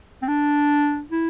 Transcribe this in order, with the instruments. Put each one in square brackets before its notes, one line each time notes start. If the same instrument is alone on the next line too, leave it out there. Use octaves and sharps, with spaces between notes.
[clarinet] C4
D4
E4